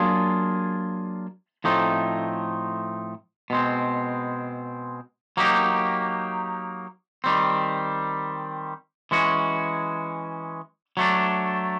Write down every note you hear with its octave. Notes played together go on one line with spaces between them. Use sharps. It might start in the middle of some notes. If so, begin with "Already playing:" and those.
Already playing: F#3 A#3 D4 F4 G#4
A2 F3 A3 C4 D#4
B2 G#3 C4
F#3 A#3 D#4 G4
D#3 G3 C4
E3 G#3 C#4 F#4
F#3 A3 D4